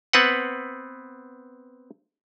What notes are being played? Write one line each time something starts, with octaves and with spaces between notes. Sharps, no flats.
B3 C4 B4 F#5